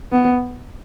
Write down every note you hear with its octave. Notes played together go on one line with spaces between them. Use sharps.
B3